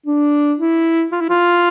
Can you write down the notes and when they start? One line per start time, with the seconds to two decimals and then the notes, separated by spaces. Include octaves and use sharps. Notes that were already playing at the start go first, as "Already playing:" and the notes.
0.06 D4
0.59 E4
1.12 F4
1.21 E4
1.29 F4